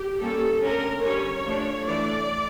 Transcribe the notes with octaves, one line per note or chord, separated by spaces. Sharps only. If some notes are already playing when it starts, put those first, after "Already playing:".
Already playing: G4
G3 A#3 C#4 A4
D3 A3 C#4 A#4
D3 G3 C#4 C#5
F3 A3 D4
E3 A3 D4 D5